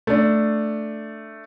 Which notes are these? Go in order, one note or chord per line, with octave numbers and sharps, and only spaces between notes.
A3 D4